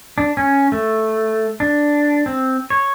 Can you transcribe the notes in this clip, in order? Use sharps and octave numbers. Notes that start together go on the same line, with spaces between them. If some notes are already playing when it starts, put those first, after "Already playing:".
D4
C#4
A3
D4
C4
C#5